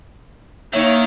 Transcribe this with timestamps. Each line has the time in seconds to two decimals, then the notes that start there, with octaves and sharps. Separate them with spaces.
0.73 D#3 A#3 D#4 C#5 E5